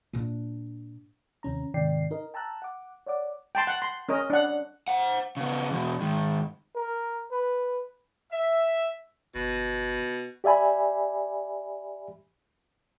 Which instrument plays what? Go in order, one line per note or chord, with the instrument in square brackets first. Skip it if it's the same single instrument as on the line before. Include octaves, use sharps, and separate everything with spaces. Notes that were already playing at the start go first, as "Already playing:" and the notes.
[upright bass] A#2 D4
[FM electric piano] D#2 C3 C#4 A#5
G#2 C3 D#3 D5 G5 C7
D#4 A#4 D#5
G5 A5 A#5 E6 F#6
F#5 D6
C#5 D5 F#5 D6
[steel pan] G5 A5 C6
F#5
C6
C#4 A#4 D#5
D4 F#5
[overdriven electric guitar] C5 F#5
C#3 B3
E2 B2
G#2 D#3
[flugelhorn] A#4
B4
[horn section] E5
[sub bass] G1 [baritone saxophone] B2
[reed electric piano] G4 D5 E5 G#5 B5